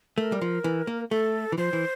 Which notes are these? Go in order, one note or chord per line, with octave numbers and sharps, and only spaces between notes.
A3 A#4
G3
F3
E3
A#3
A3 A4
E3
F3 C5
E3